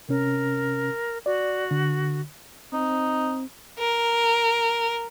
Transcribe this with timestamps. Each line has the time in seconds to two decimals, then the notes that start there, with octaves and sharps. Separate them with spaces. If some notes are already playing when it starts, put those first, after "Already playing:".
0.09 C3 C#4 A#4
1.26 F#4 D5
1.71 D3
2.73 C4 D#4
3.79 A#4